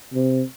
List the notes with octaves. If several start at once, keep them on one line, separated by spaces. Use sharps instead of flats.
C3